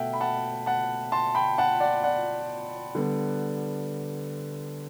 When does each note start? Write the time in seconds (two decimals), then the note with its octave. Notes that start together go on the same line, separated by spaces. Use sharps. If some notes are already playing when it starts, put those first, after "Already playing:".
Already playing: B2 A3 E5 F#5 G5
0.13 B5
0.21 F#5 A5
0.66 F#5 A5
1.12 A5 C6
1.35 G5 B5
1.58 F#5 A5
1.80 D5 F#5
2.04 D5 F#5
2.95 D3 G3 B3